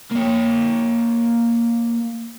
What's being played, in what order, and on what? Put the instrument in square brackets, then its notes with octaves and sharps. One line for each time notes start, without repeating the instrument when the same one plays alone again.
[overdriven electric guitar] A#3 C#5